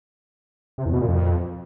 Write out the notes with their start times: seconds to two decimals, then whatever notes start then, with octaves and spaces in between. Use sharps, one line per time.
0.78 C3
0.86 E2
0.93 B2
1.01 A#2
1.08 F2